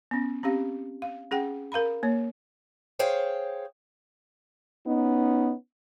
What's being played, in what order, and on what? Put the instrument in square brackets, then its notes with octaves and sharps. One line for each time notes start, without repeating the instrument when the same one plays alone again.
[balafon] B3 C#4
C4 C#4 G4 F5
F5
C#4 G#4 F#5 G5
A#4 F5 A#5 B5
A#3 C#5
[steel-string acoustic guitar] G#4 C5 C#5 F5 G5
[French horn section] B3 C#4 D#4